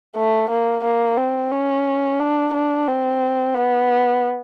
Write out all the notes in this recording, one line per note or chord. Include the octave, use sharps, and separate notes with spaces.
A3
A#3
A#3
C4
C#4
D4
D4
C4
B3